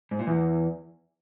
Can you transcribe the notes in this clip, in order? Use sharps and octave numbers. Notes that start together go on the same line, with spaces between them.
G#2
A#2
E2